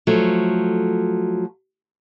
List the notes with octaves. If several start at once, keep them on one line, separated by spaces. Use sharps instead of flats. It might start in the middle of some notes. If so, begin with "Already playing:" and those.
F3 F#3 A3